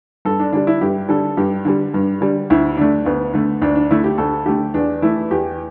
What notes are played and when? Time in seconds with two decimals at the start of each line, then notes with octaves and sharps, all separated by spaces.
0.25 G2 A4
0.40 D4
0.52 D3 G3 D4
0.67 E4
0.81 G2 G4
1.09 D3 G3 A4
1.37 G2 G4
1.65 D3 G3
1.94 G2
2.21 D3 G3
2.50 D2 E4
2.77 D3 A3 D4
3.06 D2 B3
3.34 D3 A3
3.62 D2 D4
3.75 D4
3.91 D3 A3 E4
4.04 G4
4.18 D2 A4
4.46 D3 A3 G4
4.74 E2 D4
5.02 E3 A3 E4
5.31 E2 G4